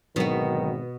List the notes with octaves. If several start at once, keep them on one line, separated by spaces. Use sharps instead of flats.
G#1 B2 D3 D#3 F#3 B3